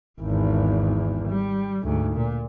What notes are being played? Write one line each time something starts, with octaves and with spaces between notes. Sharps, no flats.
G#1 E2
G3
D2 G#2
A#2